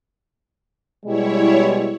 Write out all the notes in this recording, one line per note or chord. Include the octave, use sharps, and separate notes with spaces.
B2 G3 G#3 E4 C#5